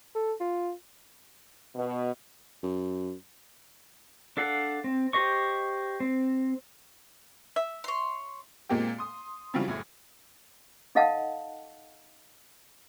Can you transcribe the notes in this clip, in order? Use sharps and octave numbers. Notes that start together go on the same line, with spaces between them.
A4
F4
B2
F#2
D4 A4 F5 F#5
C4
G4 C5 D#5 C#6
C4
E5
C#5 C6
A#2 G#3 A#3 C4 G4
C6 D#6
C#3 E3 F#3 G3 C4 F4
F#1 A2 G#6
D#4 A4 D#5 F5 F#5 A5